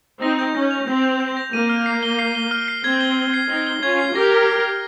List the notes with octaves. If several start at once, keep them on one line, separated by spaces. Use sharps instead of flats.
C4 D#4 A#6
G6
C#4 A#6
F7
C4 G6
G6
G6
A#6
A#3 D#7
F6
C7
G7
C7
G7
F6
C7
C4 G#6
G7
G7
C7
C4 D#4 G7
G7
C#4 F4 G#6
C7
G4 A#4 A#6
F6
F6
F6